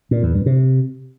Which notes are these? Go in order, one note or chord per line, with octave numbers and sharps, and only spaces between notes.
A#2
E2
G2
C3